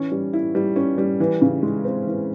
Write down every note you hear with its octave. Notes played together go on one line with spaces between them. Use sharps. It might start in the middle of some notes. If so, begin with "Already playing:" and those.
Already playing: E3 C#4
G3
E4
G3
C#4
G3
E3
C#3
G#3
C4
E3